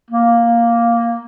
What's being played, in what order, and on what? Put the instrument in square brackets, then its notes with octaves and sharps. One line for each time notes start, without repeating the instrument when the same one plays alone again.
[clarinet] A#3